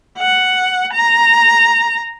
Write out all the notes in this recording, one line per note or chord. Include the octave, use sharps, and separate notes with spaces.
F#5
A#5